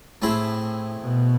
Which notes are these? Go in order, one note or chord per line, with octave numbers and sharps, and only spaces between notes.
A2 A3 C4 E4 G#4
B2